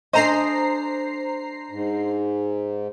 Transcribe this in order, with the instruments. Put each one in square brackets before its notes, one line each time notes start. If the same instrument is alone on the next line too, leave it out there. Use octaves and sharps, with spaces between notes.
[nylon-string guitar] D4 A4 G#5 [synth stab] C5 A#5 C7 [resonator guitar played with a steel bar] D#5
[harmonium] G#2